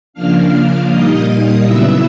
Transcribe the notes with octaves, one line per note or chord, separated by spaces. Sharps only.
C#3 F3 A#3 D4 F5 F6
A#2 G3 A#3 D#4 D#5 D#6
D#5 D#6
C#3 F#3 B3 E4 E5 E6